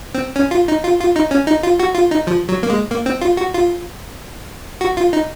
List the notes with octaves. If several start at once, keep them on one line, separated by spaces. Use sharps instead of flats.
C4
C#4
F4
D#4
F4
F4
D#4
C#4
D#4
F4
F#4
F4
D#4
F3
F#3
A#3
G#3
A#3
C4
F4
F#4
F4
F#4
F4
D#4